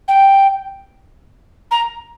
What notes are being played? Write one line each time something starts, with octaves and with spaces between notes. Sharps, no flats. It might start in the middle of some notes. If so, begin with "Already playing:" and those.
G5
A#5